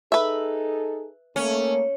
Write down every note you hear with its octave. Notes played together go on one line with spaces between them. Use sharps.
D#4 G#4 A4 B4 E5
A3 A#3 C#4